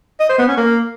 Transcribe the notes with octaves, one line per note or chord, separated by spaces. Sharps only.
D#5
C5
B3
C#4
A#3